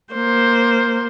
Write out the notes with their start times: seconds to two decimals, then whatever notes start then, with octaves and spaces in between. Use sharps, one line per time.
0.13 A#3 C5